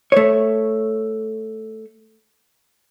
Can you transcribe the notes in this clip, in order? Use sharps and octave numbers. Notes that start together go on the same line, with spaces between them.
A3 C#5